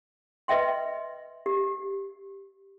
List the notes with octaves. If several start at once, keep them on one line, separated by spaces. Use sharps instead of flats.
B4 D#5 E5 G5 C6
G4